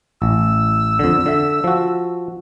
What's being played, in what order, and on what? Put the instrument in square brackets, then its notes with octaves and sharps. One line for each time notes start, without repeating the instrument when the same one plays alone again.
[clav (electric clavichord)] A1 [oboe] E6
[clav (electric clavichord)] F2 D3
D3 E5
F3 F#4